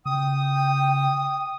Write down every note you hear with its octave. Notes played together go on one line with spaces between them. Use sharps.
C#3 G5 D#6